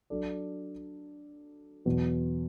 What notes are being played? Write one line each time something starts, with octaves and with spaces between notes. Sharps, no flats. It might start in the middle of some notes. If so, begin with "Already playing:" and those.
F#3 D4 A4 D5
E2 B2 F#3 B3